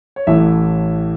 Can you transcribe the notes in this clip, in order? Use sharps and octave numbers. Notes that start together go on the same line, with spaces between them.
C#5
A1 A2 E3 A3 E5